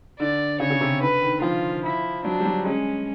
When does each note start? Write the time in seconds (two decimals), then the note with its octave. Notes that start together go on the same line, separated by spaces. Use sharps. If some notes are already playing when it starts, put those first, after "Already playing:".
0.20 D3 D5
0.60 C#3 C#5
0.70 C#3
0.81 C3
1.01 D3 B4
1.22 D#3
1.42 F3 F4
1.84 E4
2.25 F#3 D4
2.40 G3
2.45 F#3
2.65 G#3 C#4